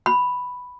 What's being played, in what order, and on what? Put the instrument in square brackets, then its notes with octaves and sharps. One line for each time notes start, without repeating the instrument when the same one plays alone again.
[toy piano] B5